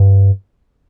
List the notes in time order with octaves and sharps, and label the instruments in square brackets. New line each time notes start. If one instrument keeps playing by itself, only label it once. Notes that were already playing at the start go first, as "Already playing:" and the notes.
Already playing: [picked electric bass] G2